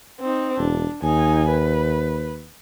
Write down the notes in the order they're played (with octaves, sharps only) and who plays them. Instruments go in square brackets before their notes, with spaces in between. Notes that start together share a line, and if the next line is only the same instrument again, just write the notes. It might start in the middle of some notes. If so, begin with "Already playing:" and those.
[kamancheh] C4 D#4
[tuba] E1 [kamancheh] D4
[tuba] D#2 [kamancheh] D#4 G#5
[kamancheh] B4